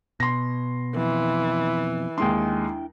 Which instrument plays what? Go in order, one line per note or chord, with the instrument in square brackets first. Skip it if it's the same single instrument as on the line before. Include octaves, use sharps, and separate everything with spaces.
[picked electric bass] B2 [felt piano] C6 A#6
[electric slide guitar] F2 [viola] E3
[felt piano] D#2 G#3 C6 [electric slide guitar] D4 E4 G5